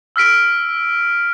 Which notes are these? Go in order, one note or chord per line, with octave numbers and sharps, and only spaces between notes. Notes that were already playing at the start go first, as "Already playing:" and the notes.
E6 F6 B6 D7